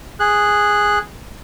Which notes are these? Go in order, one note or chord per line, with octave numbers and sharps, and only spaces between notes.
G#4 F#6